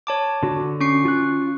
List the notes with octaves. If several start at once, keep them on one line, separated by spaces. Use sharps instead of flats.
C#5 A5 D6
D3 F#4
C#4 C#6 C7
F4 F#6